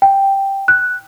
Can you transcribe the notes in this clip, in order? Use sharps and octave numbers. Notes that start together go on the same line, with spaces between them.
G5
F#6